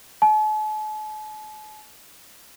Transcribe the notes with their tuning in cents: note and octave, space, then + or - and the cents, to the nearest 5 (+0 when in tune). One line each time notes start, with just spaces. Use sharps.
A5 -45